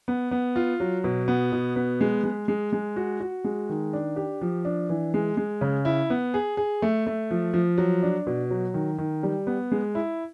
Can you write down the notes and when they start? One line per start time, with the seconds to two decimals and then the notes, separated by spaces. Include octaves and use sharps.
0.08 B3
0.31 B3
0.56 F4
0.80 F#3
1.04 B2
1.28 B3
1.52 B2
1.76 B3
2.01 G#3
2.24 G#3
2.48 G#3
2.72 G#3
2.96 F#4
3.20 F#4
3.44 G#3
3.69 D#3
3.93 D4
4.16 G4
4.41 F3
4.65 D4
4.89 E3
5.14 G#3
5.37 G#3
5.61 C#3
5.85 E4
6.10 B3
6.34 G#4
6.57 G#4
6.82 A3
7.07 A3
7.31 F3
7.54 F3
7.78 F#3
8.03 D4
8.27 B2
8.50 F#3
8.74 D#3
8.98 D#3
9.23 G3
9.47 B3
9.72 G#3
9.95 E4